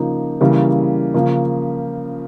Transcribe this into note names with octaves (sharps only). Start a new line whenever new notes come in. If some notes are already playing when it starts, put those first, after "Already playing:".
Already playing: C#3 F3 A#3 D#4
C#3 E3 G3 A#3
C#3 F3 A#3